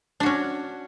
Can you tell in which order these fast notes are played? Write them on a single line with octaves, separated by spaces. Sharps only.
D4 F#4 C#4